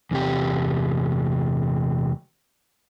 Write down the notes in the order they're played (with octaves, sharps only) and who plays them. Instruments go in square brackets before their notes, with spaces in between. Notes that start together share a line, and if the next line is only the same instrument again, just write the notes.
[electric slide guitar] E2 C3 G4